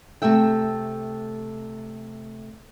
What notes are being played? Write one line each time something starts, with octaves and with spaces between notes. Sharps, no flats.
C3 A3 A4 E5 G5